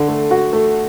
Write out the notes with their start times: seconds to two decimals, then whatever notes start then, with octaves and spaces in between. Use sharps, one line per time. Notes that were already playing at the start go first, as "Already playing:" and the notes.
Already playing: D3
0.08 A3
0.31 F#4
0.53 A3